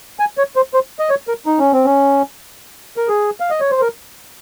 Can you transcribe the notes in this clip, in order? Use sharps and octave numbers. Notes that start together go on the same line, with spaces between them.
G#5
C#5
C5
C5
D#5
C#5
A#4
D#4
C#4
C4
C#4
A#4
G#4
F5
D#5
C#5
C5
A#4